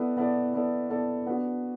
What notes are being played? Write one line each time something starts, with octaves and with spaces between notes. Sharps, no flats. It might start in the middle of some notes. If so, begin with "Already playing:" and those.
Already playing: B3 E4 A4 D5
B3 E4 A4 D5
B3 E4 A4 D5
B3 E4 A4 D5
B3 D4 F#4